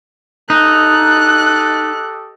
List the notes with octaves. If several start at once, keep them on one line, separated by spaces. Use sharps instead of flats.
D#4 G4 A4 D#5 F#6